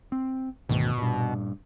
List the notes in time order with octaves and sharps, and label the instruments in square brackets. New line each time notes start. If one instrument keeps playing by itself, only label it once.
[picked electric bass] C4
[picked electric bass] D2 G#2 D#3 [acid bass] B2
[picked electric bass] G2 A#2